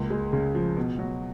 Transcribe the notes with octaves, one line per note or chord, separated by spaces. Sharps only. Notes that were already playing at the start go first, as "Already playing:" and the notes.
Already playing: C#2 A#3
G#3
C#3
F3
B2
F#3